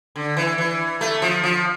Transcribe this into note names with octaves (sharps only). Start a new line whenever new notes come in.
D3
E3
E3
A3
F3
F3